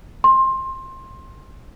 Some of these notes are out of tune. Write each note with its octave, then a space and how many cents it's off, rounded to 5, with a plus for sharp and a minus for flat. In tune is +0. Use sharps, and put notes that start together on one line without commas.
C6 +20